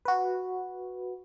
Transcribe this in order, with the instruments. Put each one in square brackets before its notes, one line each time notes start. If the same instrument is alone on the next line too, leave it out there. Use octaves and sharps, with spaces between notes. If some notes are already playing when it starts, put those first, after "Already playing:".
[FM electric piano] F#4 B4